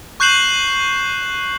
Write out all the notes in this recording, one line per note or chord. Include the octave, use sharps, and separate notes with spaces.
C#6 F#6 G6 C7 E7 F#7